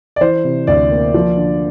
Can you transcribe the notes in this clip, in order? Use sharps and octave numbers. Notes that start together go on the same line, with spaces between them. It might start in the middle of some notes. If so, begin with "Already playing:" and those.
D5
E3 C5
C3
D2 D5
A#3
F3
D3